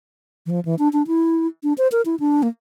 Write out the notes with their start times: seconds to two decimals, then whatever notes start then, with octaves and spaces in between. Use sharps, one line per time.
0.46 E3
0.50 F3
0.65 E3
0.79 D4
0.93 D4
1.07 E4
1.63 D4
1.78 C5
1.92 A#4
2.05 E4
2.20 D4
2.43 A#3